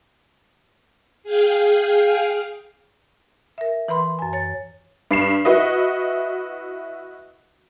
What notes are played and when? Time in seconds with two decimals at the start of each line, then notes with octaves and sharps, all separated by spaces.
1.23 G#4 F5 G5
3.58 A#4 E5
3.88 E3 B4 B5 C6
4.19 F#2 G#5
4.33 C#5 A6
5.11 G2 C7 E7
5.45 E4 F#4 B4 D#5